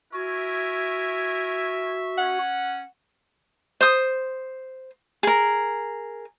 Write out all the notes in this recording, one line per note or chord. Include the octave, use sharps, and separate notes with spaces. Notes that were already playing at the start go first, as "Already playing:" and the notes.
E4 F#4 A#4 E5 G#5
C#4 F#5
C5 D#6
G#4 A#4